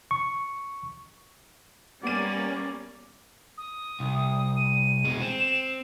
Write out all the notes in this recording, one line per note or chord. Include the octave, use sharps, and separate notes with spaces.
C#6
G3 A#3 B3 C#4 D5 D#7
D#6
C2
D#7
B2 G#3
C4 E7